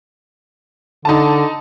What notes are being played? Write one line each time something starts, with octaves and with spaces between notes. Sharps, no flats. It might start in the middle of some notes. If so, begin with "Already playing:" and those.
D3 D#4 A5